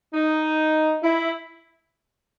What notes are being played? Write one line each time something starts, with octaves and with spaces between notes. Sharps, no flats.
D#4
E4